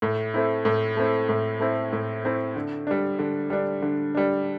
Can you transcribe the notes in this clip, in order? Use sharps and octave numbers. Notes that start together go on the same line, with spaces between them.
A2
A3 C4 E4
A2
A3 C4 E4
A2
A3 C4 E4
A2
A3 C4 E4
D3
G3 D4
D3
G3 D4
D3
G3 D4